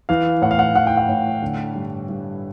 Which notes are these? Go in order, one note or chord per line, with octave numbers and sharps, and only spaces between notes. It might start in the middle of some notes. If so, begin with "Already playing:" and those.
E3 F5
A2 F#5
F5
F#5
E3 F#5
G5
F#5
A2
D3
G2
G2